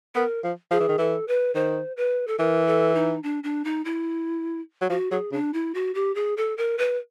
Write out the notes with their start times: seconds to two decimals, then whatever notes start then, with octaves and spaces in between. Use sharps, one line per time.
0.15 B3 A#4
0.44 F3
0.71 F3 G#4
0.80 E3
0.89 D#3
0.98 E3 A4
1.28 B4
1.55 D#3 C5
1.97 B4
2.27 A4
2.39 E3 A#4
2.67 A4
2.95 D#4
3.23 D4
3.44 D4
3.65 D#4
3.85 E4
4.81 F#3
4.90 F3 F#4
5.11 F#3 G#4
5.32 C#3 D4
5.54 E4
5.75 F#4
5.95 G4
6.15 G#4
6.37 A4
6.58 A#4
6.78 B4